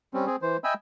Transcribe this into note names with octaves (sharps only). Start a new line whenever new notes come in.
G3 C4 C#4
C4 G#4
E3 C5
D#5 E5 G5 G#5 B5 E6